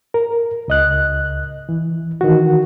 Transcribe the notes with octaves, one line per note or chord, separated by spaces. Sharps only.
A#4
C#2 D#5 F#6
E3
D#3 E3 F#4